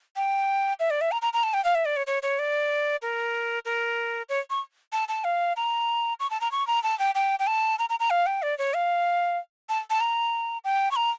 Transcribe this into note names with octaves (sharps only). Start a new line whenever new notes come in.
G5
E5
D5
E5
A#5
A#5
A#5
A5
G5
F5
E5
D5
C#5
C#5
C#5
D5
A#4
A#4
C#5
C#6
A5
A5
F5
A#5
C#6
A5
A#5
C#6
A#5
A5
G5
G5
G5
A5
A#5
A#5
A#5
F5
G5
D5
C#5
F5
A5
A5
A#5
G5
C#6
A#5